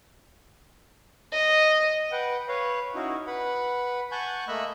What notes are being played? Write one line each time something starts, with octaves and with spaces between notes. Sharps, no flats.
D#5
B4 F#5 G5
B4 C#5 F5
C#4 D#4 E4 F#4
B4 F#5 B5
F#5 G#5 A5 C#6 F#6 G6
A3 A#3 D#5 B5 E6 F#6